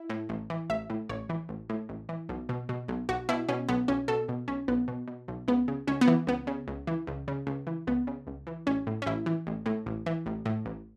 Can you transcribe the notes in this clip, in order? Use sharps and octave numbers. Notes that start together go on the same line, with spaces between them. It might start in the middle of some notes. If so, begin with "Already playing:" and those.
Already playing: E4
A2
A1
E3
A1 E5
A2
A1 C#5
E3
A1
A2
A1
E3
B1
B2
B2
B1
B1 F#4
B2 E4
B2 C#4
B1 B3
B1 C#4
B2 A4
B2
B1 C#4
B1 B3
B2
B2
B1
C#2 B3
C#3
C#2 C#4
B3
E3
C#2 B3
C#3
C#2
E3
C#2
C#3
C#2
E3
C#2 B3
C#3
C#2
E3
A1 C#4
A2
C#4
A1 E4
E3
A1
A2
A1
E3
A1
A2
A1